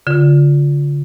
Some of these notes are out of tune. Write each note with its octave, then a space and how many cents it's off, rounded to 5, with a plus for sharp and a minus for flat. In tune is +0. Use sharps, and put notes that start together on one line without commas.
D3 -35 F4 +0